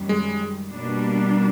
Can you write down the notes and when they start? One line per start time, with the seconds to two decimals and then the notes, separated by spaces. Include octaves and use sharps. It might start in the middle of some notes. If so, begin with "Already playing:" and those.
Already playing: F#2 D#3 G3
0.09 G#3
0.75 B2 G3 A#3 D4